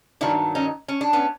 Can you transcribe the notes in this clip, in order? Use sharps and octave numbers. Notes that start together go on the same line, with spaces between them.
G2 D#3 F#3 D4 E4
C#4 D#4
C#4
D4
B3 C#4